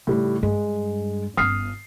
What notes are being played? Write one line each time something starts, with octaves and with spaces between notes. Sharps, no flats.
A2 C#3 G3 D#4
G2 G#3
G1 C#4 D#6 F6 C7